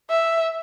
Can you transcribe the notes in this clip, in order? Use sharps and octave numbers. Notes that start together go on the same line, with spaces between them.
E5